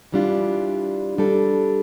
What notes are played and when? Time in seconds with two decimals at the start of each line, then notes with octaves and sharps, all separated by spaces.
0.12 E3 G3 D4 F4
1.18 G3 D4 A4